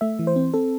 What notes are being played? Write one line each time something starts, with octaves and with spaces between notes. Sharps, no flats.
A3 E5
E3
C5
C4
C4 A4